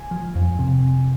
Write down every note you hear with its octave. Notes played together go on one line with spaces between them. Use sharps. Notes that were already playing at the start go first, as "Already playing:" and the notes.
Already playing: G#5
F3
F2
C3